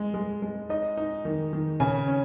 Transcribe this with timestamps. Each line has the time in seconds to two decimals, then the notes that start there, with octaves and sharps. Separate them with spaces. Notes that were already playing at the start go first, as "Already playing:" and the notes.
Already playing: G#3
0.14 G#3
0.42 G#3
0.69 D#4 D#5
0.97 D#4
1.25 D#3
1.53 D#3
1.80 C#3 G#5
2.07 C#4